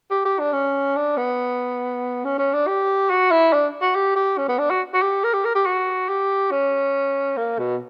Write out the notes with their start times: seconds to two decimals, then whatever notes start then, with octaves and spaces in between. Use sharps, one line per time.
0.11 G4
0.25 G4
0.40 D4
0.53 C#4
0.96 D4
1.17 B3
2.25 C#4
2.38 C#4
2.53 D4
2.67 G4
3.10 F#4
3.31 E4
3.53 D4
3.82 F#4
3.95 G4
4.16 G4
4.38 C#4
4.48 B3
4.59 D4
4.70 F#4
4.94 F#4
5.02 G4
5.24 A#4
5.33 G4
5.45 A#4
5.55 G4
5.66 F#4
6.09 G4
6.51 C#4
7.37 A#3
7.59 B2